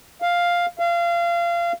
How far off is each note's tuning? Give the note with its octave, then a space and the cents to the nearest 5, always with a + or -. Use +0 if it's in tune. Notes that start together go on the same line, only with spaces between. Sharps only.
F5 +5
F5 -25